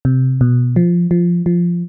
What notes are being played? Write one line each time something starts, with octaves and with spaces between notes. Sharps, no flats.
C3
B2
F3
F3
F3